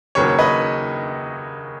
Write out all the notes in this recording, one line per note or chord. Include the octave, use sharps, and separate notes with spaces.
D#2 C#3 F#3 B3 C#5
C#5
B4 D#5